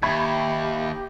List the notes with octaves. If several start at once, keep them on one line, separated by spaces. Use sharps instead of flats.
D#2 G4 E5 B5 C#6 G#6